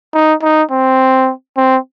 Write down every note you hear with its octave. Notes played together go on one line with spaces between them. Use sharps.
D#4
D#4
C4
C4